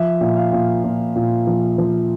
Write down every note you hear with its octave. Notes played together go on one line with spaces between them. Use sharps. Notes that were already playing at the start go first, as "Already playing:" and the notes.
Already playing: F3 E5
A#2
F5
A#2
A#2
A#2
F3
F3